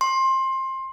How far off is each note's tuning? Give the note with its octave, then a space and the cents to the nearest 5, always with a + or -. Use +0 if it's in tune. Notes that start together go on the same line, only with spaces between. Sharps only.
C6 +20